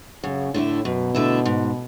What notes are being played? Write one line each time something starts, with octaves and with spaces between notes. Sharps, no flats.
F#2 C#3
A2 D3 A3 E4
F#2 B2
D3 A3 E4
G#2